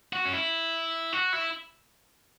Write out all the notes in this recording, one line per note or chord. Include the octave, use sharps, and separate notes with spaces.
F#4
C#4
E4
F#4
E4